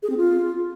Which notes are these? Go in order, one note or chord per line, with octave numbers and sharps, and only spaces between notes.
G#4
C4
F4